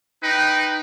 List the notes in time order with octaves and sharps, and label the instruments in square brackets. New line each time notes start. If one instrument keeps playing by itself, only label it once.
[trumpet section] D#4 B4 G5